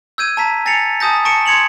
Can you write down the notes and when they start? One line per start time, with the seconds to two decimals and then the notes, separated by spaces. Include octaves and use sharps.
0.18 E6 G6 G#6 D#7
0.37 A5 A#5 B6
0.66 G#5 A6 A#6 C7 C#7 F7
1.00 G#5 A5 D#6 G6 A#6
1.25 A5 C#6 A#6 C#7 D7 E7
1.46 C6 G#6 C#7 F7 F#7